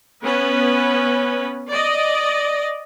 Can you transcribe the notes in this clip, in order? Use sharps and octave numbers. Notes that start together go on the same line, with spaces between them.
B3 C#4 B4
D5 D#5